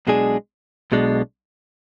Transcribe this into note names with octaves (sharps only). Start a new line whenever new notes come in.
B1 B2 G#3 D4 G#4
B1 B2 G#3 D4